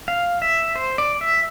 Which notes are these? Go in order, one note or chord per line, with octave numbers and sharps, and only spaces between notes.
F5
E5
C5
D5
E5